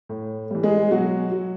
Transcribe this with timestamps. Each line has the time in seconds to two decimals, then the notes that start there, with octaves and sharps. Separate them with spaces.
0.09 A2
0.51 E3 G3
0.63 G#3 G#4
0.91 B2 F#3 F#4
1.32 F#3